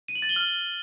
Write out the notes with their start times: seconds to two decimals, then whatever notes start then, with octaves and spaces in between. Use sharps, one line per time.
0.08 D#7
0.15 F#7
0.22 A6
0.29 G7
0.36 F6